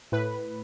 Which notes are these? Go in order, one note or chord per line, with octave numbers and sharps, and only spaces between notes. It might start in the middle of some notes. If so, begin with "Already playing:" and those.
A2 B4